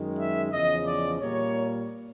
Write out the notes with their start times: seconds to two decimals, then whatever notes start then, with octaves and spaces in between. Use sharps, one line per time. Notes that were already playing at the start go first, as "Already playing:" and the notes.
Already playing: F#2 D#3 G#3
0.18 E5
0.52 E2 C#3 F3 D#5
0.87 D5
1.21 A#2 G3 A#3 C#5